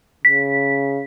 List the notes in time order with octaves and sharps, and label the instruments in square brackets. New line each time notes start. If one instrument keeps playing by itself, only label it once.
[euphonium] C#3 [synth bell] B6